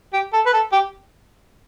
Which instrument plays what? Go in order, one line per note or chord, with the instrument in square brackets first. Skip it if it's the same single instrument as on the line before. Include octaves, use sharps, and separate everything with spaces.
[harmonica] G4
A4
B4
A4
G4